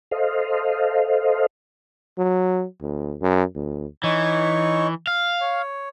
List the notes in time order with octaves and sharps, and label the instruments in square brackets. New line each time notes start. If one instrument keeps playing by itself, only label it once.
[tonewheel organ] A4 C5 D#5 F5
[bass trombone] F#3
D2
F#2
D2
[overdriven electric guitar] E3 [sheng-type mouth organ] D#4 C#5 C#6
[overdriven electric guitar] F5
[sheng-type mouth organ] C#5